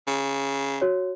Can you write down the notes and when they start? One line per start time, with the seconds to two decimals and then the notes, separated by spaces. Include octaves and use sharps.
0.07 C#3
0.81 F#4 C#5